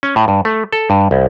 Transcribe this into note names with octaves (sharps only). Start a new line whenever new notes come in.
C#4
A2
G2
A3
A4
G2
C2